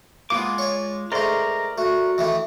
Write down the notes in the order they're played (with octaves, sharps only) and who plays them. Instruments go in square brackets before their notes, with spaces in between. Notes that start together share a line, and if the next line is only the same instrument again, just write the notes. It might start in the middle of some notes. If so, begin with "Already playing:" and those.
[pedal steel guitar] G#3 F4 D6 [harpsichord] A#3 B3
[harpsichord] C#5 D5
[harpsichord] G#2 A3 [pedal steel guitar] A#4 D5 C6 [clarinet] A#5
[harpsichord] A3 [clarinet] F#4
[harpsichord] D#3 E3 A3